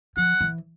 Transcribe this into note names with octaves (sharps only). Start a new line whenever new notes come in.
F3 F#5
E3